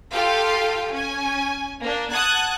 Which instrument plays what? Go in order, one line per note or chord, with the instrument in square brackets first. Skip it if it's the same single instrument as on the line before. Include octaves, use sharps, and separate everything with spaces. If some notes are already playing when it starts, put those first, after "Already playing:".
[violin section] F4 G4 A4 F5 G5
C#4 G#5
A#3 D4
F#5 A5 D#6 F#6 G#6